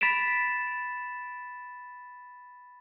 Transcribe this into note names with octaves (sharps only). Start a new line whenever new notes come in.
B5 A6 B6 D7 E7